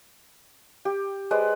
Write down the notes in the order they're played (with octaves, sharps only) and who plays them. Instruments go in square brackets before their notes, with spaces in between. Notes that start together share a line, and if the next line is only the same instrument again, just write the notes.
[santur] G4
G#3 B4 C5 D5